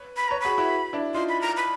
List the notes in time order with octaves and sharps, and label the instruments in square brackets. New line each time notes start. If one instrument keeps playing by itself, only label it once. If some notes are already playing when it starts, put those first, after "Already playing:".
Already playing: [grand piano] B4 C#5
[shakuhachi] B5
[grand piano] B4 C#5 [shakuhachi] A#5
[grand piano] F#4 G#4 [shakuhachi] B5
[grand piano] E4 F#4
D4 E4
[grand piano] D#4 F4 [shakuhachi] C6
[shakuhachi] B5
A#5
B5